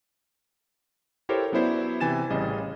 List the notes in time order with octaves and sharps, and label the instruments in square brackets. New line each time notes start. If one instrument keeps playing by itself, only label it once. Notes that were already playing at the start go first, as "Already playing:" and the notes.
[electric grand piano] E4 G4 A4 A#4 C5 C#5
F#3 B3 C#4 E4 C5 D5
C3 E3 G#5 A6 E7
A1 C#3 G3 D#5